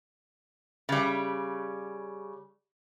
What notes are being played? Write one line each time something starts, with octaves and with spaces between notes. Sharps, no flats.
C#3 G3